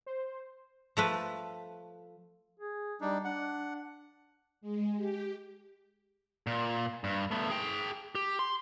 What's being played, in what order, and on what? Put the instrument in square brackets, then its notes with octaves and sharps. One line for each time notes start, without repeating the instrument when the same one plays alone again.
[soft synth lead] C5
[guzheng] F3 A3 B4
[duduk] G#4
[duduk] G3 [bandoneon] D4 D#4
[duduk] D4 [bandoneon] F#5
[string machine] G#3
G4
[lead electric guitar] A#2
G2
A3 B3
G#4 G5
G4
C6